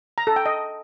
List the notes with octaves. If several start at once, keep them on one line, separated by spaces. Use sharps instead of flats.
A#5
A4
G5
D#5